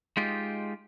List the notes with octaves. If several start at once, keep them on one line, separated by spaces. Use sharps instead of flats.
G#3 D#4 F4 G4